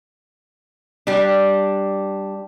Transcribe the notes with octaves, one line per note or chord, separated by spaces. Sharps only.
G3 D4